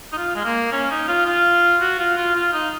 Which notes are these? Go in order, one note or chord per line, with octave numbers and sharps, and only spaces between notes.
D#4
F4
G#3
A#3
C#4
D#4
F4
F4
F#4
F4
F4
F4
D#4